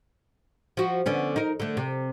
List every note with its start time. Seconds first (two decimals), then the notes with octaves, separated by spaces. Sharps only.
0.77 F3 F#4
1.06 D3 B3 C#4
1.36 D#4 A#4
1.60 D3 A3
1.77 C3